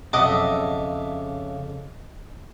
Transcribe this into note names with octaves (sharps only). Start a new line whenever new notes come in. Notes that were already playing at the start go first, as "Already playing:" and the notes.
B1 F2 C#3 D#5 E5 F#5 A5 D6